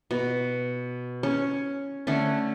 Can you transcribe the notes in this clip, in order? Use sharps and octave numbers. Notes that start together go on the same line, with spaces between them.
B2
C#4 C#5
D3 A3 C#4